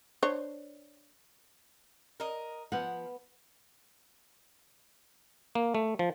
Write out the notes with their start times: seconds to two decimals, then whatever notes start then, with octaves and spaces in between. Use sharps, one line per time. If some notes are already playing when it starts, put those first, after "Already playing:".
0.23 D4 C5 C#5
2.20 A#4 D#5
2.72 F3 B3 F#5
5.55 A#3
5.75 A3
5.99 F3